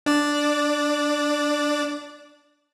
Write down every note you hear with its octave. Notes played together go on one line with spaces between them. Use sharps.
D4 D5